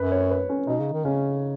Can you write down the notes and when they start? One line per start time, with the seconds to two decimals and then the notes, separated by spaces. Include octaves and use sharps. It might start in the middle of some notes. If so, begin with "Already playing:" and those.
Already playing: F#2 B4
0.12 C#5
0.31 B4
0.49 C#4
0.67 B2 D#4
0.80 C#3
0.93 D#3
1.04 C#3 C#4